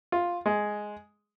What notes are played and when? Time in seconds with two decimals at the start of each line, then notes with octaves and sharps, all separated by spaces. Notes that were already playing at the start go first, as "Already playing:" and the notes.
0.12 F4
0.46 G#3